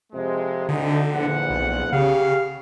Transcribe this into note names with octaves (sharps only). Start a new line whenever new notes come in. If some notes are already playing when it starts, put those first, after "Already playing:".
F2 C3 G#3
D2 D3 D#4
A#1 E2 F#5
B1
C#3 G4 F5